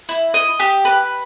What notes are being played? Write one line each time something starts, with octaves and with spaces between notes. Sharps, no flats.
E4
D#5
G4
B4